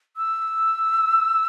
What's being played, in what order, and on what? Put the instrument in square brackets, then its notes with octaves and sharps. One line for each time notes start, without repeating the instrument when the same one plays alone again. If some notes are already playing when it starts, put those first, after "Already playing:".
[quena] E6